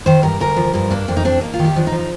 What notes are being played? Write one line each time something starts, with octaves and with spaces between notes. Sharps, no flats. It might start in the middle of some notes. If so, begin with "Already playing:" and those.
D#3 C5
G2 A#4
D2 A#4
F3
G2 A#4
A#3 D4
F2 D4
D#4
C4 D4
A#3 D#4
F4
D#3
G4
F3 D4
D#4
F3
D#4